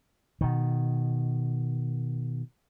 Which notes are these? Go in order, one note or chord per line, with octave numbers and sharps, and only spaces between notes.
B2 D#3